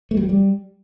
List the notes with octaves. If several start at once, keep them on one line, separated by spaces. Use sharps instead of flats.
A3
G3
F#3
G3